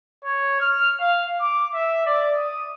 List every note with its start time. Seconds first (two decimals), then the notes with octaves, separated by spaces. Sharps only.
0.24 C#5
0.60 F6
1.00 F5
1.41 D6
1.74 E5
2.06 D5
2.36 D#6